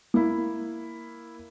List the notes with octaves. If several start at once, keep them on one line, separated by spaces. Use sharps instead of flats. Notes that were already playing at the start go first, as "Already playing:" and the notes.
A#3 E4